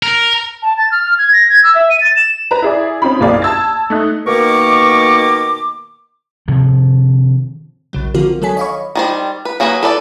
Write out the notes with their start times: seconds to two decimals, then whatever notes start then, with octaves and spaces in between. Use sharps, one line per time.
0.03 A#4
0.63 A5
0.78 A6
0.92 F6
1.04 F6
1.18 G#6
1.33 A#6
1.50 G#6
1.64 E6
1.75 E5
1.90 D#7
2.01 A6
2.16 E7
2.51 B4 A#5
2.62 E4 G#4 D5
3.02 C4 C#4 D#4 F4 B5
3.20 F#1 B1 A#3 G#4 D5 F5
3.42 A5 E6 G#6 A6
3.90 A3 D#4 F#6
4.27 B2 D#3 A#3 A#4 C#6 D6
6.48 C3 D#3 F3
7.93 A#1 C#3 F#3
8.14 D3 F3 C4 F4 F#4 A#4
8.42 D#3 F#3 A4 C#5 G#5 B6
8.57 C#5 D#5 F5 B5 C#6
8.95 D#3 G3 C5
9.45 B4
9.60 F#3 A#3 F#4 G#4 B4
9.83 A4 B4 D5